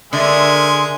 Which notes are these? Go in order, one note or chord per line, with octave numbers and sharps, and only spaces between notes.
D3 G#3 A#4 E5 G#5 C6